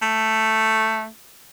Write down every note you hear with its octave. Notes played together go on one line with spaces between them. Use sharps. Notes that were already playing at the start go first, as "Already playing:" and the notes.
A3